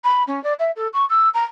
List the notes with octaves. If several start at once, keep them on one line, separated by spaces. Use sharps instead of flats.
B5
C#4
D5
E5
A4
C#6
E6
A#5